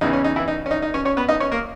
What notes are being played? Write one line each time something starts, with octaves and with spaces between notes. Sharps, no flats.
E2 C#3 E3 D#4
C#4
D#4
E3 E4
D#4
C#4
D#4
D#4
C#4 C#5
C#4 C#5
B3 B4
D#4 D#5
C#4 C#5
A#3 A#4